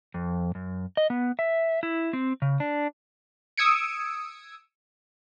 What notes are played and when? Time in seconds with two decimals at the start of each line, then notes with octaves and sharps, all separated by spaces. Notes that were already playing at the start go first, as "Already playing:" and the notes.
0.14 F2
0.55 F#2
0.97 D#5
1.10 B3
1.39 E5
1.83 E4
2.13 C4
2.42 C#3
2.60 D4
3.58 D#6 E6 G#6 C#7 D7